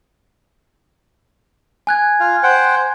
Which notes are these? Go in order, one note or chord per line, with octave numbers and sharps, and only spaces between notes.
G#5 F#6 G#6
F4 F5
C5 F#5 G5